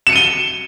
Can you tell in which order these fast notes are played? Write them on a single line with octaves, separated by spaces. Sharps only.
E7 C#7 D#7 G7